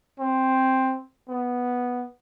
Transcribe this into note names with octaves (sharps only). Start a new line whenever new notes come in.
C4
B3